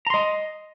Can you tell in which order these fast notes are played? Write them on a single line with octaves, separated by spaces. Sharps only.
A#5 C6 D#5